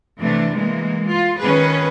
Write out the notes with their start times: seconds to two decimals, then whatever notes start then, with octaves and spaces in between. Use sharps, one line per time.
0.19 C3 E3 A3 D4
0.53 E3 G#3 A#3
1.07 F4
1.40 D#3 C#4 G#4 B4